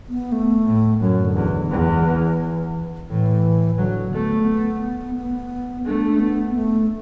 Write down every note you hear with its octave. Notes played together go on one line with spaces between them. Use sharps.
B3
A3
A2
F#2 F#3
D3
E2
E3
E2
A2 E3
D3 F#3
A3 B3
B3
B3
A3 D4
B3
A3